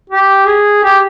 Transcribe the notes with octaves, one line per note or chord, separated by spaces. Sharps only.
G4
G#4
G4